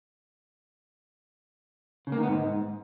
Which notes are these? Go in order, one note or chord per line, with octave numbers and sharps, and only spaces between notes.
C#3
A#3
D#3
B3
G#2